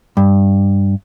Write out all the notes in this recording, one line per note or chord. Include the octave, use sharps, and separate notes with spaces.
G2